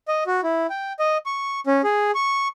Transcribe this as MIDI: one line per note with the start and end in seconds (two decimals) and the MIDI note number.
0.08 0.24 75
0.27 0.41 66
0.43 0.67 64
0.70 0.93 79
0.99 1.18 75
1.26 1.60 85
1.67 1.82 61
1.84 2.11 68
2.15 2.48 85